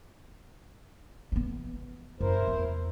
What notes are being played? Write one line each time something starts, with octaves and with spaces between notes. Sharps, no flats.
E3 B3
F#2 E4 A#4 C5
E2